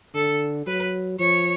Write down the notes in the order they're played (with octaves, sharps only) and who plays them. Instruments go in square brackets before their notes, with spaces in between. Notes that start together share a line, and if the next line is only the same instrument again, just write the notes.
[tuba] D3 [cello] A4
[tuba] F#3 [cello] B4
[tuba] F3 [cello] C#5